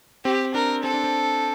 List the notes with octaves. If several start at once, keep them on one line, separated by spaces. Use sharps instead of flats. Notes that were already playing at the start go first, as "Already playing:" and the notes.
C4 G4
D4 A#4
C4 A4
D4
C4